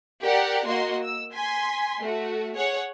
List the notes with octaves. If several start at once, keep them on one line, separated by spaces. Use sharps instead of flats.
G4 A#4 D5 F#5
A#3 F#4 D#5 C6
E6
G#5 C6 B6
A3 F#4
G#4 C#5 F#5